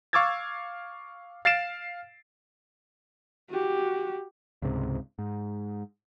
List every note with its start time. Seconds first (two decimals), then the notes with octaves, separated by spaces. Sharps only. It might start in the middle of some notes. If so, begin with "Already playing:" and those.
0.13 F5 C#6 D6 E6 G#6 A6
1.45 F5 A6 C7 D7 E7
3.50 F#4 G4
4.62 C#2 G#2 C3
5.19 G#2